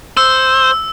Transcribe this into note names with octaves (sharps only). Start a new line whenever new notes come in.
C5 E6